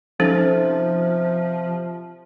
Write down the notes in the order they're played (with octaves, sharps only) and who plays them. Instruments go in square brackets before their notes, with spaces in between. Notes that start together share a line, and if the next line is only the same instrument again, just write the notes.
[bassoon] C3 [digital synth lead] F3 [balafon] C#4 D#4 A4